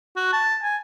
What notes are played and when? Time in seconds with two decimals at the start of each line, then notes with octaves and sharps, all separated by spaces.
0.16 F#4
0.33 A5
0.63 G#5